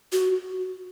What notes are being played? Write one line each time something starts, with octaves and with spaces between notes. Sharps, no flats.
F#4